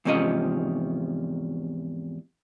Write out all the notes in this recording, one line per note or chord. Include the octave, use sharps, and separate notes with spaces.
E2 G#2 C3 F3 C#4 D#5